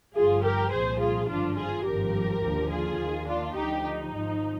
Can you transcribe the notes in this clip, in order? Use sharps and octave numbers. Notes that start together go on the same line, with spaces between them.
G1 G2 F3 F4 G#4
G4 A#4
C2 A#2 F3 G#4 C5
F4 G#4
G#1 G2 D3 F3 D4 F4
F4 G#4
G#1 G2 F3 G4 A#4
D#2 D3 F3
F4 G#4
D#2 D#3
D4 F4
D2 D3 F3 D#4 G4
D#4
G#1 G#2 F3